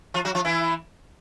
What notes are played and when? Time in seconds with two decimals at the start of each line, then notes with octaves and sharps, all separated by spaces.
0.14 F3 F4
0.25 F#3 F#4
0.35 F3 F4
0.45 E3 E4